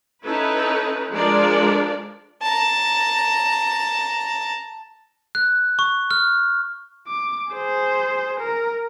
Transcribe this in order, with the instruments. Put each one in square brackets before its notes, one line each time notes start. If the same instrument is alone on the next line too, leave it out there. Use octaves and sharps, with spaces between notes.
[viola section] C#4 D#4 E4 A4 B4
F3 G#3 D4 F4 A#4 D5
[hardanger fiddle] A5 A#5
[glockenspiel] F#6
C#6
F6
[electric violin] D6
G#4 C5
A#4